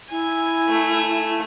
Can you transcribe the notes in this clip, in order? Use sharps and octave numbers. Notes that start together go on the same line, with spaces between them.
E4 G#5
A3